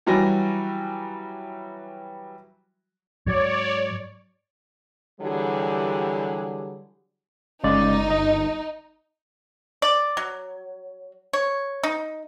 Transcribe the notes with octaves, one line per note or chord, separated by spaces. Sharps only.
E3 F#3 G3 F#4 G#5 A#6
G#2 F#3 C#5 D5
D3 E3 F#3 G3 G4 G#4
G1 C#3 G#3 D#4 D5
D#5
D5
F#3
C#5
D#4